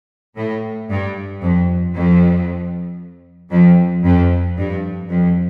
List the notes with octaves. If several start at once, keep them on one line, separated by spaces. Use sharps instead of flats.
A2
G2
F2
F2
F2
F2
G2
F2